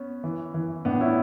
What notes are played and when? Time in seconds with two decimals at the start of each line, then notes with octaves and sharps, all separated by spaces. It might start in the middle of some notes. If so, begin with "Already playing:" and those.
Already playing: B3 C#4
0.24 E3
0.54 E3
0.85 A2 B3 D4
1.01 C#4 E4